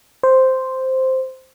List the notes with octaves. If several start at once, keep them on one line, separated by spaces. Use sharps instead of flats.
C5